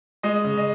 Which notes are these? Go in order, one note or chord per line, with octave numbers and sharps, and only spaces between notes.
G#3 D#5
C#3
D#5